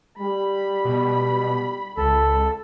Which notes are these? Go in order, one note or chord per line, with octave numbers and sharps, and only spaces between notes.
G3 B5
B2
C#2 A4